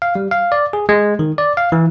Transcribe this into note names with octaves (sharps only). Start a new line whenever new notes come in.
F5
G3
F5
D5
G#4
G#3
D#3
D5
F5
E3